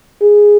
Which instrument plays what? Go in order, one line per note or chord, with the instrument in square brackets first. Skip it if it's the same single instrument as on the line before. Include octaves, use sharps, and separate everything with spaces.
[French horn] G#4